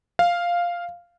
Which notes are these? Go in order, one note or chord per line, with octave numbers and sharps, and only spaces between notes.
F5